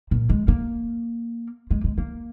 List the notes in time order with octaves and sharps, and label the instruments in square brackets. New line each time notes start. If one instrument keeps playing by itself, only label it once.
[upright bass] A#2
G#3
A#3
G#3
G#3
A#3